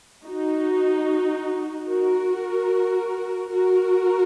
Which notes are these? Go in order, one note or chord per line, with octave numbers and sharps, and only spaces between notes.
D#4 F#4
F#4 A#4
F#4 A#4